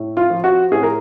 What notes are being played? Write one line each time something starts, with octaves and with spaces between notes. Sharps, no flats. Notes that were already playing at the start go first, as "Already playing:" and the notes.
Already playing: A2
F4
F3
F#4
A2 G#4
A#4